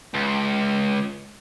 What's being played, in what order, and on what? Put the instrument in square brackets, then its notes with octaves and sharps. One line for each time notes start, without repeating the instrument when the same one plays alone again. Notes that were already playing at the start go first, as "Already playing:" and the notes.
[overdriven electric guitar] C#2